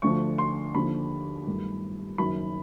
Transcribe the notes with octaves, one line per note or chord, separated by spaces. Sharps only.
D2 D3 F3 C#6
C6
D#2 D3 F3 B5
G1 G2 D#3 F#3 A3
F#1 F#2 D#3 F#3 B5